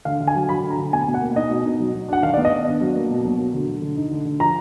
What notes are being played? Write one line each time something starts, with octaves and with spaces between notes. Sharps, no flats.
D3 F5
D3
G#5
F#3
F#3 B5
D3
A#5
D3
B2 G#5
B2
F#5
A#3
D#4 D#5
B2
D#4
F#3
F#3
D4 F#5
D#3 F5
D5
B3
D#5
B3
D4
F#3
A#3
B2
F#3
F#3
D3
D3
D3
D#4
D3
D3
F3 A#5